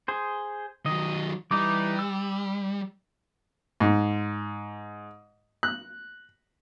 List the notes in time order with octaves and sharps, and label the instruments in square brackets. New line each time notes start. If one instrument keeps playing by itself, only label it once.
[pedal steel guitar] G#4 C5
[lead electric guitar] D#3 F#3 [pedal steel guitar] D#5
[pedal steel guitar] E3 D#4 D6 [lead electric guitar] G3
[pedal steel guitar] E6
[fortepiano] G#2
F#6